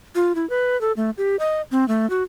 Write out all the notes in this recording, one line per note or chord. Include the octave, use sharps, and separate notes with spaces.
F4
E4
B4
A4
A3
G4
D#5
C4
A3
F#4